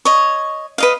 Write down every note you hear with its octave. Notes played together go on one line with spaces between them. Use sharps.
C#5 D#5
B4 D#5 F5